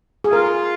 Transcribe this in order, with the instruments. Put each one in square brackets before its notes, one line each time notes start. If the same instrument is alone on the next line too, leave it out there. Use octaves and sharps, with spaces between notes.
[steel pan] G#4
[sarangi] F4 [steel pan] A#4